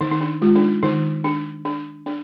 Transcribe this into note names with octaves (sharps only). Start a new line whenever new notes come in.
D#3 D#4
D#4
D4
G#3 F4
D4
D#4
D#3 D#4
D4
D4
D4